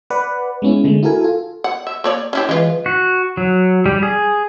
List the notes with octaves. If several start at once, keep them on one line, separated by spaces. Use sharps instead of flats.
B4 D5 F#5
G#3 B3 C#4 E4
D3 G#3 A3
E4 F#4 A4 A#4 G#5
F4 A4
F#5
E5 E6
A#3 C#5 D5
C#4 E4 G4
E3 G#3 F4 B4
F#4
F#3
G3
G#4